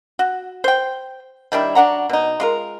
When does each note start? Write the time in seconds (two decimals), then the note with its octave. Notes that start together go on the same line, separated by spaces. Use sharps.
0.19 F#4
0.64 C5 G5
1.52 D#3 G3 D4 E4
1.75 F#3 D4 F#5 A#5
2.09 B2 D#4
2.40 G#3 F4 A#4